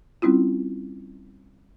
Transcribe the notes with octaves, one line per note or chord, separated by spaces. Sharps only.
G3 C4 C#4 E4 F4